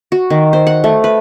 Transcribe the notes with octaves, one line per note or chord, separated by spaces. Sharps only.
F#4
D#3
C5
F#5
A3
B4